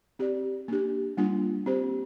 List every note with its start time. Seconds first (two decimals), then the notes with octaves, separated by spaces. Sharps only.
0.19 C4 G4 D5
0.68 A#3 D4 G4
1.17 G3 A#3 D4 F4
1.66 C4 G4 C5